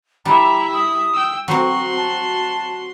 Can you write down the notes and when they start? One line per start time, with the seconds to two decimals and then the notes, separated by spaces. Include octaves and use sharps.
0.25 G3 E4 E5 A#5
0.73 D#6
1.13 G5 E6
1.48 F#3 C4 F#4 C6 C#6
1.97 A5